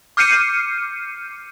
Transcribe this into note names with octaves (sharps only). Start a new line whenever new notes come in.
D6 F6 G6 C7 C#7 D#7